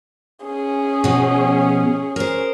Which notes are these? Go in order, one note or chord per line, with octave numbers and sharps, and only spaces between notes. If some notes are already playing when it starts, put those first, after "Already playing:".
C#4 G#4
B2 F3
A#4 C5